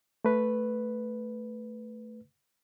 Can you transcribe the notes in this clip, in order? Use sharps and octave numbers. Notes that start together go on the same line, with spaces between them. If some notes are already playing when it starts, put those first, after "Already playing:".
A3 B4